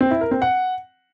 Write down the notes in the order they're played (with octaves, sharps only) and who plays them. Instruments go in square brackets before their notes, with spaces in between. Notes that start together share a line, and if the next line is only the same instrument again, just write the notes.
[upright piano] C4
E4
A#4
C4
F#5